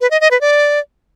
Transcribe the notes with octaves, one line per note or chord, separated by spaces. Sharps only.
B4
D#5
D#5
B4
D5